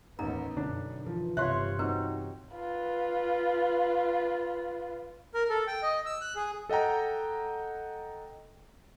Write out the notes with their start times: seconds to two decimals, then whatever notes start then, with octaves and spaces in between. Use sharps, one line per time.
0.19 A1 D#2 B3 D#4 A#5
0.57 F#2 B2 D3 D4
1.06 E3 F3
1.37 G1 C3 F4 C#5 E5 F5 C6 F#6
1.79 C4 D#4 F#4 B4
2.54 F4 B4
5.34 A#4
5.50 A4
5.67 G5
5.82 D#5
6.06 E6
6.21 F#6
6.36 G#4
6.69 A4 D#5 F#5 G5 A#5